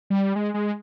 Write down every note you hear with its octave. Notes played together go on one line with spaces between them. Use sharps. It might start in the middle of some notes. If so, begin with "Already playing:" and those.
G3
G#3
G#3